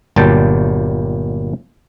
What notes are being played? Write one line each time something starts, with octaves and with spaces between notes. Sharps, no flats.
G1 A#2 F#3 G3 G5 A5